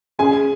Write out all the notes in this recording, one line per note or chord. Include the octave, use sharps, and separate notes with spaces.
C#3 G#4 G#5
C#3